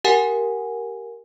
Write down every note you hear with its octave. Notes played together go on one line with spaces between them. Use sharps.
G4 A#4 F#5 G#5